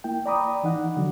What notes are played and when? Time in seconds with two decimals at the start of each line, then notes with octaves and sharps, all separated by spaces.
0.04 A#3 E4 G5
0.26 D5 G5 A#5 B5 D6 D#6
0.64 E3 D#4 F#5
0.97 D3 F#3